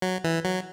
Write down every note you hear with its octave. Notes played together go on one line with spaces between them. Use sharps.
F#3
E3
F#3